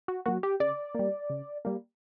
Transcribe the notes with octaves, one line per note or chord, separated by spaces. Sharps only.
F#4
F#3 A#3 F#4
G4
C#3 D5
G3 A#3
C#3
G3 A#3